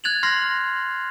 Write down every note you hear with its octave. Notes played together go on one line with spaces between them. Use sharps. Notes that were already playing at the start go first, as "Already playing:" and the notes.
F#6 G#6 A6 F7 F#7
C6 F6 A#6 C7